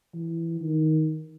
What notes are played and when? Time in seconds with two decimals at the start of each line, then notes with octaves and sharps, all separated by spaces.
0.14 E3
0.61 D#3